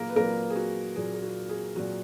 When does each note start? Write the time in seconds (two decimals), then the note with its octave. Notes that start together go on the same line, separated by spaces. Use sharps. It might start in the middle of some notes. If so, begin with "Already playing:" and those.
Already playing: A#2 F#3 A#3 G#4 A#4
0.09 B4
0.16 A#2 F#3 A#3 A#4
0.50 G#4
0.56 F#4
0.96 A#2 F#3 G#4
1.14 G#4
1.22 F#4
1.49 G#4
1.76 F#3 F#4
1.79 A#2